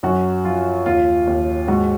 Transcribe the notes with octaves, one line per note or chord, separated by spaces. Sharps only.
F#2 F#4
F3 F4
D#2 F4
D#2
G#2 F#4